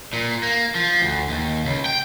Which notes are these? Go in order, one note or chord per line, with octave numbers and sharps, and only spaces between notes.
A#2
A#3
F3
D2
D#2
C#2
G5